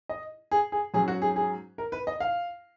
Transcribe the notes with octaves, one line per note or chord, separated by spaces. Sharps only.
D#5
G#4
G#4
G#2 F#3 C#4 G#4
F#4
G#4
G#4
A#4
B4
D#5
F5